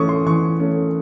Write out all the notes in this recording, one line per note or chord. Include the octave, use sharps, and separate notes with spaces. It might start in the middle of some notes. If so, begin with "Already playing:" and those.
Already playing: E3 A3 C#4 C#6 D#6
C6
E3 C#6
A3 C#4